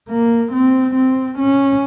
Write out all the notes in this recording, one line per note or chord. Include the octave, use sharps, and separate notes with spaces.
A#3
C4
C4
C#4